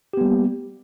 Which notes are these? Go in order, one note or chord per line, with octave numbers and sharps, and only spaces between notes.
G3 A#3 B3 G4